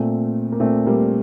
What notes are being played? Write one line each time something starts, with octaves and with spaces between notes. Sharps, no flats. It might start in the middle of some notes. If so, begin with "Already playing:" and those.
Already playing: A#2 A3 C4
A#3
A#2 A3 C4
G3 A#3